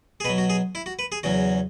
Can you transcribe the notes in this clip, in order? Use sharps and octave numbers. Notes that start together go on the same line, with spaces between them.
G#4
B2 F#3 B4
F#4
G#4
E4
F#4
B4
G#4
E2 C#3 F#3 F#4